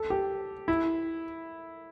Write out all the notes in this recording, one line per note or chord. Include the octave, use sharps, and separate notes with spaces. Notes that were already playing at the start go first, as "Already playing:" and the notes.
Already playing: A4
G4
E4